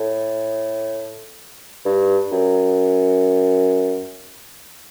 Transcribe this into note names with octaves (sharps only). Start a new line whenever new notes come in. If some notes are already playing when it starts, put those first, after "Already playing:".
Already playing: A2
G2
F#2